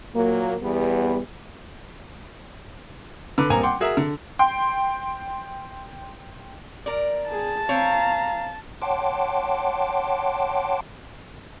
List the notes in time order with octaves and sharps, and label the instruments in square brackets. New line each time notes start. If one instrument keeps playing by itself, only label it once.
[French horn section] A#2 F#3 A#3
E2 G3 B3
[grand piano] D3 B4 D6
D#1 A1 A#3 C4 G#5 A#5
F#5 G5 C6 D6
F#4 G#4 A#4 E5
D3
[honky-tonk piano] G5 C6
[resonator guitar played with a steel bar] A#4 D5
[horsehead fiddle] G#4 [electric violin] A5
[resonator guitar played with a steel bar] C4 C#5 [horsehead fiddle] F5 A#5
[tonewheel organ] C#5 F#5 G5 A5 C6 D6